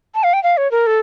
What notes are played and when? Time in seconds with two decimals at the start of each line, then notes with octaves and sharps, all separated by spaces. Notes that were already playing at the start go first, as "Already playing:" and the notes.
0.15 A5
0.24 F5
0.33 G5
0.43 F5
0.57 C#5
0.71 A#4
0.87 A4